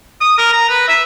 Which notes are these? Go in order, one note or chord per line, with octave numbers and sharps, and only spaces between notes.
D#6
A#4
A#5
B4
E5